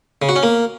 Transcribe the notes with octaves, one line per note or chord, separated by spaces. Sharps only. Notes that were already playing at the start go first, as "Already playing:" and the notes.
C#3
F#4
C#4
A#3